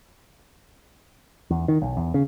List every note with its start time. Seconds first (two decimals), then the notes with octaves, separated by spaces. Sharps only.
1.50 E2
1.68 D#3
1.82 B1
1.97 E2
2.14 C#3